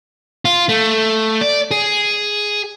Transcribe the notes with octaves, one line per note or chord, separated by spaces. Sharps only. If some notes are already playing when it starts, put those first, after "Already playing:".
F4
A3
D5
G#4